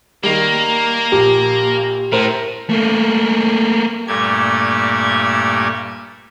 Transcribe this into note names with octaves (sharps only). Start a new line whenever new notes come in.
D#3 G3 A#3
A#1 G4
A2 A#4 C5
A3 A#3
G2 A#2 A3 G4 G#6